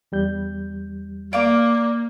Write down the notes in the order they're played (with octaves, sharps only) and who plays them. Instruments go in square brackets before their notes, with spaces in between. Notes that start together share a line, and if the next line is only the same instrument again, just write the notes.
[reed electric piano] E2 G3 G6
[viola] A#3 [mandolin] D5 F5 D6